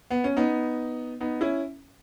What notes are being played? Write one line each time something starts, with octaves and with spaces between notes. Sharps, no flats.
B3
C#4
B3 D#4
B3 D#4
C#4 E4